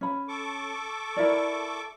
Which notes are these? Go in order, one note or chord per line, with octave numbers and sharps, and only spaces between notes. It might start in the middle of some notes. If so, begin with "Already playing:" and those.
C#4 B5
A4 C#6 D6
E4 A#4 D5